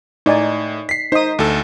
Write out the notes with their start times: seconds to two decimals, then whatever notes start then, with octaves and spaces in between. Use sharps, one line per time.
0.26 A2 D#4 D5 G#5
0.89 B6 C7
1.12 D#4 C5 D#6
1.39 D2 A4